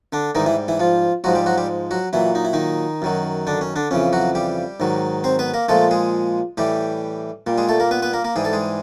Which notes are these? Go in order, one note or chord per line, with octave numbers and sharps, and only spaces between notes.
D3 D4
G#2 D#3 E3 G3 D#4
E3 E4
E3 E4
F3 F4
G#2 F3 F#3 G#3 F#4
G3 G4
F#3 F#4
G3 G4
F#3 F#4
A#2 E3 F#3 E4
D#4
E4
D#3 D#4
F#2 D#3 F#3
D3 D4
C#4
D3 D4
F2 C#3 E3 C#4
F#3 F#4
G3 G4
G#2 D#3 F#3
C4 C5
B3 B4
A#3 A#4
A#2 F3 G#3 A3 A4
G#3 G#4
A2 E3 G3 G4
A#2 G3
G#3 G#4
A3 A4
A#3 A#4
B3 B4
B3 B4
A#3 A#4
A#3 A#4
G#2 E3 G3 G#4
A4
G#3 G#4